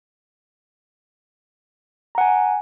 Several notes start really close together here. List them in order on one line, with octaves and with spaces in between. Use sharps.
A#5 F#5 G#5